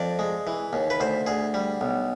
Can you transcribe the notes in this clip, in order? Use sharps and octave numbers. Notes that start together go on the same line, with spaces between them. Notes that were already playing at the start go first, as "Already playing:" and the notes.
Already playing: F2 D5
G#3
E3
D#2
B4
D2 C5
D2 G#4
G3
B1